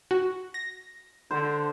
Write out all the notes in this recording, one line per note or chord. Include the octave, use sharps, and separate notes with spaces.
F#4
A#6
D3 D4 C5